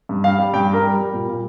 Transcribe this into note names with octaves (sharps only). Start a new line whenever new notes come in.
G2
G3 F5
G3
G2 G5
G3
A#4
G3
G3
A#2
A#2